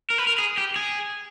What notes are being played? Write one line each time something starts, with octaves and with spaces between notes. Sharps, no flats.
A#4
B4
A#4
G#4
G4
G#4